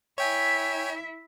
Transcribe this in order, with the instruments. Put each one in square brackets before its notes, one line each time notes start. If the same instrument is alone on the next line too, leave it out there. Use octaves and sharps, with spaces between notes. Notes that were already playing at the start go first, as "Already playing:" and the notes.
[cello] E4 E5 [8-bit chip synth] C#5 G5 G#5